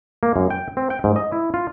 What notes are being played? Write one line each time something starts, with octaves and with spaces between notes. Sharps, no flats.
A#3
F#2
G5
C4
G5
G#2
D#5
E4
F4